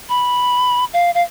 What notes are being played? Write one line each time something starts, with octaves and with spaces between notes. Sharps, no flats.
B5
F5
F5